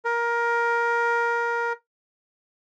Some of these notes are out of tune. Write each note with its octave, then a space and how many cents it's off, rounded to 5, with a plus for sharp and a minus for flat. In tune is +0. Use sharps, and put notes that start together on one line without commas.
A#4 +15